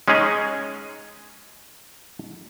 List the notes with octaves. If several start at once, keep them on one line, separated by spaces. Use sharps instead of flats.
G#3 C#4 D#4 G#4 C#5 D#5